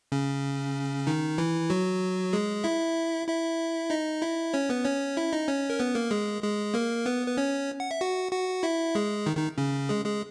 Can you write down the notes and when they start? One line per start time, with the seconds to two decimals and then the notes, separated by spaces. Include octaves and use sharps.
0.12 C#3 C#4
1.07 D#3 D#4
1.38 E3 E4
1.70 F#3 F#4
2.33 G#3 G#4
2.64 E4 E5
3.27 E4 E5
3.90 D#4 D#5
4.22 E4 E5
4.53 C#4 C#5
4.69 B3 B4
4.85 C#4 C#5
5.17 E4 E5
5.33 D#4 D#5
5.48 C#4 C#5
5.70 A#4
5.79 B3 B4
5.95 A#3 A#4
6.11 G#3 G#4
6.42 G#3 G#4
6.74 A#3 A#4
7.06 B3 B4
7.27 B4
7.37 C#4 C#5
7.80 F#5
7.91 E5
8.00 F#4 F#5
8.32 F#4 F#5
8.63 E4 E5
8.95 G#3 G#4
9.26 D#3 D#4
9.37 D#3 D#4
9.58 C#3 C#4
9.89 G#3 G#4
10.05 G#3 G#4